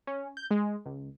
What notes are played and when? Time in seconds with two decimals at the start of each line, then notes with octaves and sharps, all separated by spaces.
0.07 C#4
0.37 G6
0.51 G#3
0.86 C#2